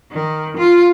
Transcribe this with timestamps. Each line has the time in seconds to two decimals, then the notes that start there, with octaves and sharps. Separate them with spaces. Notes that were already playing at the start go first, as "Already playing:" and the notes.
0.11 D#3
0.55 F4